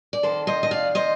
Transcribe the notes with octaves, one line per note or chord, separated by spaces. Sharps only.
D5
F2 D#3 A4 C5
C5 D#5
D#5
D5 F5
C5 D#5